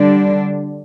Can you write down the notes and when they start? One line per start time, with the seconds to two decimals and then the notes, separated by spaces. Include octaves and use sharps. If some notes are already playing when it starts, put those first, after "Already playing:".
Already playing: D3 G3 D4